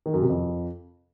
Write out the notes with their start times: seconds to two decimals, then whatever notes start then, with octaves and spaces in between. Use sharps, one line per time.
0.06 D#3
0.14 F#2
0.21 C3
0.29 F2